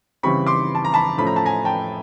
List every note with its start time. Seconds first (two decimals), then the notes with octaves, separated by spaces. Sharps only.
0.23 C#3 E3 G3 C4 B5 C#6
0.47 C6 D6
0.75 A5
0.85 A#5
0.94 A5 B5
1.18 A2 F3 A3 C#4 B5
1.27 A#5
1.36 A5
1.45 G#5 A#5
1.65 G5 A5